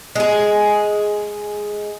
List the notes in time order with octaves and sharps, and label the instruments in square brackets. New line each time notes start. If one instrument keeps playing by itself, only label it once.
[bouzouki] G#3 G#4